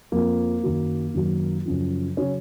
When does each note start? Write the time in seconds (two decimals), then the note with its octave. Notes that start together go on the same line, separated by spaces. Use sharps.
0.12 F2 F3 A#3
0.63 F#2 D#3 F#3
1.14 F#2 D#3 F#3
1.66 F#2 C#3 F3
2.17 C#3 F#3 C#4